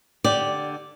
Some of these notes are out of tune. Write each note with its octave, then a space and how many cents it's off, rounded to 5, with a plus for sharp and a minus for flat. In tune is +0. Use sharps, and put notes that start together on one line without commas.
D3 +15 G4 -5 D5 -5